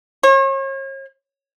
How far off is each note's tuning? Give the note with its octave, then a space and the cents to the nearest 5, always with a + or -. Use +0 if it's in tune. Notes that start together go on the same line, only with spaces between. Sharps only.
C#5 -40